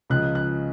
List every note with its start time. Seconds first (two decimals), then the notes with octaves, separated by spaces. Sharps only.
0.10 C#2 C#3 F3 G#3 F#6
0.35 F#6